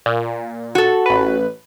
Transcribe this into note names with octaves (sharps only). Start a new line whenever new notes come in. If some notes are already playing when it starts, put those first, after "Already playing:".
A#2
F#4 A4
A1 B4